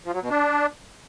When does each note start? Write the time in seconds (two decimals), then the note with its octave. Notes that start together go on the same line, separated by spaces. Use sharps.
0.05 F3
0.14 F#3
0.22 B2
0.30 D4